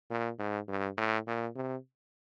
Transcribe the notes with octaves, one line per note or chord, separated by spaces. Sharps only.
A#2
G#2
G2
A2
A#2
C3